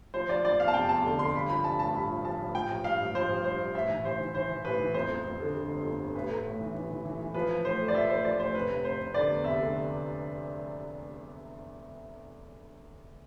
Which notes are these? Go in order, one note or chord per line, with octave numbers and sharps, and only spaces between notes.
F3 C5
F3 D5
F3 D5
E2 F5
A5
F1 G5
E2 A5
D3
D3 C6
G2 B5
F3 B5
G2 A5
A1 A5
G2 B5
F3
F3 A5
A1
F3 G5
A1
G2 F5
A1
F3 C5
A1
G2 C5
G2
A1 E5
E3
A1 C5
E3
E3 C5
E3
A1 B4
E3
F2 C5
F2
F2
D3
D3
G1
F2
G1
A1 B4
A3
A2
E3
E3
E3
E3
E3
F3 B4
F3
A2 C5
A3
D5
F3 E5
A3 C5
F3 D5
A2 C5
F1 B4
F1
F1 C5
F1
D3 D5
E2
F1 E5
D3